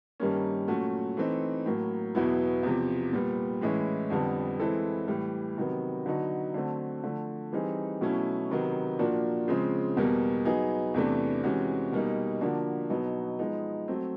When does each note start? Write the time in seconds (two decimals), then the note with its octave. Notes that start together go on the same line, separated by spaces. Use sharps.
0.20 G2 D#3 G3 A#3 C#4
0.68 A#2 F#3 A3 C#4 F#4
1.17 E3 A3 C4 D#4
1.66 A2 F#3 A#3
2.15 E2 B2 F#3 B3 E4
2.63 E2 C3 F3
3.12 A#2 G3 B3
3.61 A2 E3 G#3 C#4 E4
4.10 F2 D3 G3 B3
4.60 E3 G#3 C4 E4 A4
5.08 A2 E3 G3
5.57 C3 D#3 F#3 B3
6.06 D3 F#3 B3 D#4 F#4
6.54 D3 F#3 A3 C4
7.04 D3 F3 A3
7.52 E3 G3 C4 D#4 G#4
8.01 B2 F#3 A3 C#4 E4
8.50 C3 D#3 F#3 B3
8.99 A#2 F3 A#3 D4 F#4
9.48 C#3 F3 G#3 C4
9.97 E2 B2 G3 A#3
10.45 F#3 B3 D#4 G#4
10.94 E2 C3 E3 A3 D4
11.43 C3 E3 G#3 C#4 F#4
11.92 B2 G3 A#3 D#4
12.41 D3 F3 A#3 D4 F#4
12.90 B2 F#3 B3 D#4
13.39 F3 G#3 B3 D#4
13.88 F#3 A3 C4